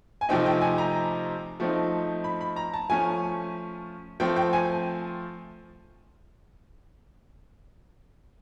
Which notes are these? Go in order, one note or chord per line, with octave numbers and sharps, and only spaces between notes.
G#5
C3 F3 A3 C4 D#4 G5
G5
G#5
A#5
F3 A3 C4 D#4
B5
B5
A#5
A5
F3 A3 C#4 G#5
F3 A3 C4 G5
G5
G#5